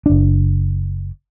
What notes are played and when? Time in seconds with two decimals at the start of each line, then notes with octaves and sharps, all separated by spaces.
0.06 F#1 D4